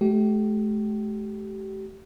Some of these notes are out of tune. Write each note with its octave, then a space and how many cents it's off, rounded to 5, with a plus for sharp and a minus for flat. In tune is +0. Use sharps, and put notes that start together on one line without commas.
A3 -45 G4 -30